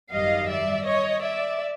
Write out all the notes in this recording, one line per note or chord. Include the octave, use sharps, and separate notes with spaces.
G#1 F#2 D#3 G3 D#5 F5
D5 E5
C#5 D#5
D5 E5